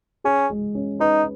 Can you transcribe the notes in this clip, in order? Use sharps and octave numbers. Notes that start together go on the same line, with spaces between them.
C#4 G#4
G#3
C#4
D#4 B4